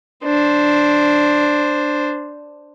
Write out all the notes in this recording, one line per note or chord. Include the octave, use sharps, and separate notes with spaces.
D4 C5